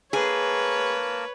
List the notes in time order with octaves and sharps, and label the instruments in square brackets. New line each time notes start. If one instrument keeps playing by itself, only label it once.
[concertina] A#3 A#4 A5 [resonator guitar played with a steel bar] G#4 [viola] B4 C#5